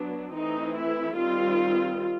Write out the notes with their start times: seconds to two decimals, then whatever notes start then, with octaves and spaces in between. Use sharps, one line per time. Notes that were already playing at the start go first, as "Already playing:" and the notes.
Already playing: F#3 B3 D4
0.32 E3 A3 C4 D#4
0.74 E4
1.16 D#3 G3 C4 F4